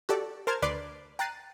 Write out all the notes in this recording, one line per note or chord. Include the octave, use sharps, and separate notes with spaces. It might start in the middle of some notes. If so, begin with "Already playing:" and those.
F#4 G4 A4 D5
A#4 C5 A5 F6 G#6
D2 B4 D5 C6 D6 C7
G5 A#5 F#6 A6 C7 D#7